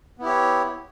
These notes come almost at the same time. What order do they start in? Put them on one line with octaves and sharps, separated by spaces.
B3 E4 G4 C#5